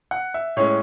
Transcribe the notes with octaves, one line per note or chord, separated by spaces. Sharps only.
F#5
E5
A2 G#3 C#4 C#5